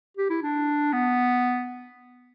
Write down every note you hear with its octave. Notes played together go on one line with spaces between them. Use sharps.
G4
E4
D4
B3